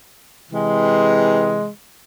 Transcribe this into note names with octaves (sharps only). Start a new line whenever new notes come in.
C3 E3 G#3